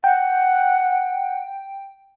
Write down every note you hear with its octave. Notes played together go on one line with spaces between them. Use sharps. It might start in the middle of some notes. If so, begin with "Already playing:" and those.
F#5 G5